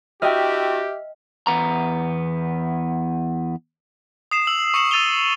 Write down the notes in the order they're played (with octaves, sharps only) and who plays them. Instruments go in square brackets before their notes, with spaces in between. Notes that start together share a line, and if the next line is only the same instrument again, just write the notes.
[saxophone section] D4 E4 F#4 [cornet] G4 [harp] D#5 G5 [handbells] E5 F6
[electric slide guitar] E2 B3 A#5
[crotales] D#6 C7 E7
E6 F#7
C#6 C7 C#7 E7 F#7
D#6 E6 A6 D#7 F7 G7